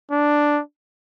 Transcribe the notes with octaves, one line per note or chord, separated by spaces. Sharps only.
D4